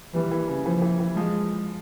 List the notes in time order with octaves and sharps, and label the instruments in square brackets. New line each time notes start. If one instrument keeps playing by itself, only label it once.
[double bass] E3 [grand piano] G3
[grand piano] E3
C#3
[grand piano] E3 [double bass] F3
[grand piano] E3
E3
[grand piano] F3 [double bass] G#3